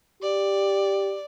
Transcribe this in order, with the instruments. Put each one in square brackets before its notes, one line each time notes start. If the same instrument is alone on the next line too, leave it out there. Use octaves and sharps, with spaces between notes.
[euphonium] G4 [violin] D5